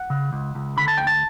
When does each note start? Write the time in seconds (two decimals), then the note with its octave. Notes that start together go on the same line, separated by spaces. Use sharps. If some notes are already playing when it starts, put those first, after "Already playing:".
Already playing: F#5
0.10 C#3
0.33 C#2
0.55 C#2
0.77 D3 B5
0.88 A5
0.98 D2 G5
1.07 A5